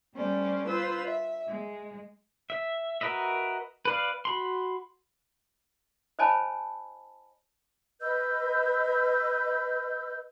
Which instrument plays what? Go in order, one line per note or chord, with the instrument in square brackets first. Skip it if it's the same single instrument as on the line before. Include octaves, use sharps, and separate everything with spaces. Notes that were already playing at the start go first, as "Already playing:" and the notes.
[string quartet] G3 A3 C#4 C5 D5
F4 B4 C5 E6
E5
G#3
[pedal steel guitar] E5
F#4 A#4 B4 D#5 E5
B4 D5 F5
F#4 B5 C6
[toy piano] C5 C#5 D#5 G#5 A5 B5
[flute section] B4 D#5 E6 G6